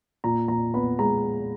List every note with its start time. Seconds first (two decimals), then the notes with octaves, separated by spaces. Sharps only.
0.24 A#2 A#5
0.48 A#2 A#5
0.74 B3 B5
0.99 G#3 A#5